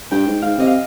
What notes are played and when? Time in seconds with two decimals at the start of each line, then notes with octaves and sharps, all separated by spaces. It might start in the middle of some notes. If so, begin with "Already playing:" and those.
0.11 G2 G5
0.27 G#2
0.42 G#2 F5
0.58 C3 D#5
0.67 F5